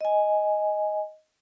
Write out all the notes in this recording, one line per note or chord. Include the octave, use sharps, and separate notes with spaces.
D#5 G#5